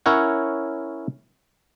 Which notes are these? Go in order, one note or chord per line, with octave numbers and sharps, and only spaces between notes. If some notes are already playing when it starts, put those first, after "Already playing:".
C#4 E4 A#4 C#5 F#5